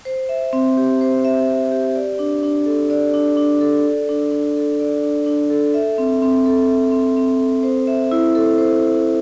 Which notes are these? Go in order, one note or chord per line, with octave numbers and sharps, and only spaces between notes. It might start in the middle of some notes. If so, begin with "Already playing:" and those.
C5
E5
C4
G4
C5
E5
C4
G4
D5
D4
D4
A4
D5
D4
D4
A4
D5
D4
D4
A4
D5
D4
D4
A4
E5
C4
C4
A4
E5
C4
C4
A4
C5
E5
E4
A4
C5